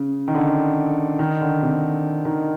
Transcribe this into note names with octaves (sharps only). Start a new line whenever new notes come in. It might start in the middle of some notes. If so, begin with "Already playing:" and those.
Already playing: C#3
D#3
D3
D#3
D3
C3
D#3